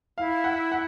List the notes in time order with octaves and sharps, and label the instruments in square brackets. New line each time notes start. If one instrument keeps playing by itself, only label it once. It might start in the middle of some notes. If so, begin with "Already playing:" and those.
[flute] E4 [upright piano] F5
[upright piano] F#5
F#5